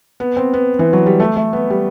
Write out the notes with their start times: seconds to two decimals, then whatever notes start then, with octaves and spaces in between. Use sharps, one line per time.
0.20 B3
0.37 C4
0.53 B3
0.79 E3
0.93 F#3
1.06 G3
1.20 A3
1.37 A3
1.53 B3
1.70 G3